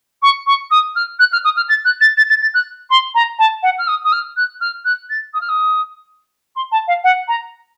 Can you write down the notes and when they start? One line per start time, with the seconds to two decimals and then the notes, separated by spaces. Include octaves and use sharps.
0.22 C#6
0.46 C#6
0.70 D#6
0.95 F6
1.19 F#6
1.32 F6
1.44 D#6
1.56 F6
1.69 A6
1.85 F#6
2.00 A6
2.17 A6
2.29 A6
2.41 A6
2.54 F#6
2.90 C6
3.14 A#5
3.38 A5
3.62 F#5
3.78 F6
3.87 D#6
4.04 D#6
4.12 F6
4.36 F#6
4.60 F6
4.85 F#6
5.09 A6
5.33 D#6
5.41 F6
5.49 D#6
6.55 C6
6.71 A5
6.87 F5
7.04 F#5
7.28 A#5